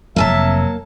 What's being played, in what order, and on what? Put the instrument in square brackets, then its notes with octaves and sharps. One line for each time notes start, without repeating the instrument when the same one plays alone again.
[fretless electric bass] F1 F2 [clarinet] F#3 [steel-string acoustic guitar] A#3 G#5 A5 [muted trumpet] E5